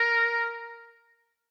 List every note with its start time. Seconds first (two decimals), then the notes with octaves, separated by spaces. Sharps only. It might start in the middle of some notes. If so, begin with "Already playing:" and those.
Already playing: A#4